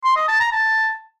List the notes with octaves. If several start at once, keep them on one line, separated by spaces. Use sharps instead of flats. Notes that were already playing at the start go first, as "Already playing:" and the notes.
C6
D#5
A5
A#5
A5